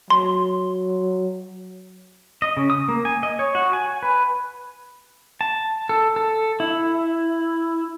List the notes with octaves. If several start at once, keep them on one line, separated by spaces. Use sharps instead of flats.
F#3 C6
D#5
C#3
D#6
A#3
G#5
D#5
C#5
F#4
G#5
B4
A5
A4
A4
E4